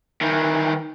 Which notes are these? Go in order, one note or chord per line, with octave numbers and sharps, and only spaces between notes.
D#3 E3